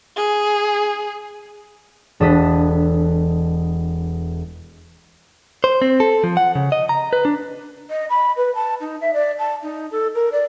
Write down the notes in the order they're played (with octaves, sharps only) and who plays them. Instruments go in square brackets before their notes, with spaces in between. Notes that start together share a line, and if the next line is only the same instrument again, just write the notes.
[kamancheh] G#4
[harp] E1 D4 A4 D#6 F#6 B6
[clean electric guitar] C5
C4
A4
F3
F#5
C#3
D#5
A#5
B4
D4
[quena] D#5
B5
B4
A5
D#4
E5
D5
A5
D#4
A4
A#4
D5